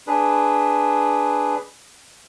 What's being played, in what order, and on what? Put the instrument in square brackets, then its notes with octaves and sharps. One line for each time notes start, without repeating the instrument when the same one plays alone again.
[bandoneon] D4 G#4 B4